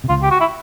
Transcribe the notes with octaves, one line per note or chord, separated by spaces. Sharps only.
C3
C#2 C#3 F4
G4
F#4
E4